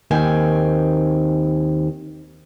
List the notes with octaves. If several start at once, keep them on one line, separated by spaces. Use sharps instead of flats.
D#2 D#3 C4 G#5